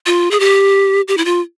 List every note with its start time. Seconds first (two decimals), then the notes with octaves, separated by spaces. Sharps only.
0.06 F4
0.31 G#4
0.40 G4
1.08 G4
1.17 E4
1.25 F4